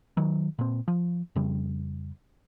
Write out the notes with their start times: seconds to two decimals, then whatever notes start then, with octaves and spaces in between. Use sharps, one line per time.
0.17 D#3 F#3
0.59 A#2 C4
0.88 F3
1.36 F2 C#3 G3